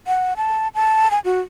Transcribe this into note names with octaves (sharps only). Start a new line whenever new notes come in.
F#5
A5
A5
G#5
F#4